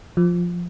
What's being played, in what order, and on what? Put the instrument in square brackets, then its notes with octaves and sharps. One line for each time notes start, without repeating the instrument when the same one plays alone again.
[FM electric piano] F3